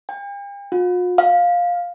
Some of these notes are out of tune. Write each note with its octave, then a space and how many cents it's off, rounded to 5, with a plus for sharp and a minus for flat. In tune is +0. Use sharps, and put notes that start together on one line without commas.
G5 +45
F4 +45
F5 +10